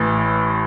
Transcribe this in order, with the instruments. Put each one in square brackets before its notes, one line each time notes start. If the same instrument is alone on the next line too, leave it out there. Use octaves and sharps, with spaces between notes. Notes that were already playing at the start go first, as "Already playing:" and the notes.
Already playing: [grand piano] A1 A2 E3